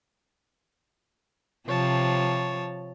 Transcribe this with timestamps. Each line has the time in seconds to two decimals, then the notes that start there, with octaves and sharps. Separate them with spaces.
1.68 C3 F3 C#5 A5